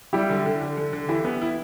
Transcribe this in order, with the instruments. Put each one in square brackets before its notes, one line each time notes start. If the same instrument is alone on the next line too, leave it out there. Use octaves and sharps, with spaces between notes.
[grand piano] G3 [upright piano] E4 G4
[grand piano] D3
D3
D3
D3
D3
[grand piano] E3 [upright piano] E4 G4
[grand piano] B3
E4